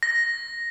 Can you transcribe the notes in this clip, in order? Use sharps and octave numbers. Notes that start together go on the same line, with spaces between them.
A#6